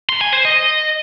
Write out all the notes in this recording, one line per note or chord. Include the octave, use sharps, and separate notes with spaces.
C6
G#5
C5
D#5